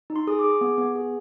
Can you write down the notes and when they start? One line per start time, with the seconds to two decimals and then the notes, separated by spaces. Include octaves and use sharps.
0.10 D#4
0.16 C6
0.27 G#4 D#6
0.39 D6
0.44 G#4
0.61 B3
0.78 B3
0.95 G#4